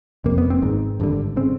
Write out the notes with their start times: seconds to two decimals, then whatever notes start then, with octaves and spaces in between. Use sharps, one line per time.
0.24 F#1 F2 C3 A#3
0.38 B3
0.50 C4
0.62 G#1 G#2
1.00 G#1 G2 D3
1.36 C#3 C4